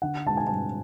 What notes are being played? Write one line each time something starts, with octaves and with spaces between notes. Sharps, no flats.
D3 F#5
G#3 A5
G#5
G2 A5